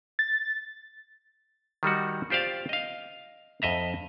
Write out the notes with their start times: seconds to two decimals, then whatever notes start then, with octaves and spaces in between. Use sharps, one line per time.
0.19 A6
1.83 D#3 G3 D#4 F#4
2.30 F4 G4 C5 D5 F5
2.69 D#5 F5
3.62 F2 D#5 E5 A#5